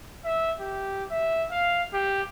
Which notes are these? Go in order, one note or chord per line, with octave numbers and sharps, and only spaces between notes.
E5
G4
E5
F5
G4